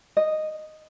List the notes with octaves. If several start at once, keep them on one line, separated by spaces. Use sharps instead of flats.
D#5